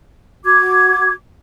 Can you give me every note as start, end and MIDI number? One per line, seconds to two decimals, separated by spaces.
0.45 1.11 66
0.45 1.11 86
0.45 1.11 92